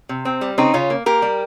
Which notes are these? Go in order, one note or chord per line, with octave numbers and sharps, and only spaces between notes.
C3
C4
G3
C#3 C4 D#4
C#3 C#4 F4
A#3
A#3 G4 A#4
G3